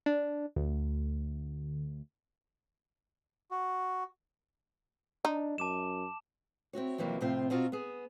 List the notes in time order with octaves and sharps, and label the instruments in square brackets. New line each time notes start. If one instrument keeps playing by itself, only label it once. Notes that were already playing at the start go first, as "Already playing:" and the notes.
[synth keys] D4
D2
[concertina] F#4
[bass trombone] D4 [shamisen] D#4
[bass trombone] F#2 [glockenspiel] A5 D6 E7
[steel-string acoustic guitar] C4 E4 F#4 C#5
F2 C3 E3 F#3 A#3
A2 C3 F3 C4 F4 F5
B2 C4 F4 F#4 A#5
B3 G#4